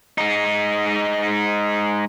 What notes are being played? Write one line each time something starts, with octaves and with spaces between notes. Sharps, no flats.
G#3 D#4